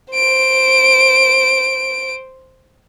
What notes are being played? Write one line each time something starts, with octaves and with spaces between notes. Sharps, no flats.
C5 D7